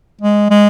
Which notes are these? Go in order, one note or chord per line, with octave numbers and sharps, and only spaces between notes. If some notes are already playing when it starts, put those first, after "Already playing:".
G#3
G#3